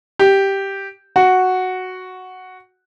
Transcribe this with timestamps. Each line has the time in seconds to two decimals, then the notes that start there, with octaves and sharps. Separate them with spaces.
0.19 G4
1.16 F#4